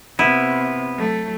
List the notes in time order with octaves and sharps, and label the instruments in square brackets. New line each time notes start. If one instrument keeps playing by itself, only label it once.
[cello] C3 [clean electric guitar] B3 [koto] E4
[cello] F#3 A3